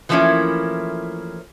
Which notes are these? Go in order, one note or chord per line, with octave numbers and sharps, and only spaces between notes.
E3 F3 A3 A#3 C#4 E4